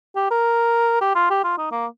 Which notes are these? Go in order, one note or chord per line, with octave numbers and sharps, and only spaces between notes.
G4
A#4
G4
F4
G4
F4
D#4
A#3